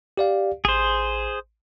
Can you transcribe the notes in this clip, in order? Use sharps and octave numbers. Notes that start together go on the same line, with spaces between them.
G4 D5 F5
A1 G#4 C5